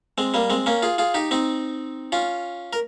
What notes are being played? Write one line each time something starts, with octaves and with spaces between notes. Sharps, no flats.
G#3 C4
G3 A#3
G#3 C4
A#3 C#4
F4 G#4
F4 G#4
D#4 G4
C4 D#4
C#4 F4
A#4